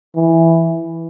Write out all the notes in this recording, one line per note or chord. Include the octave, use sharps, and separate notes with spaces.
E3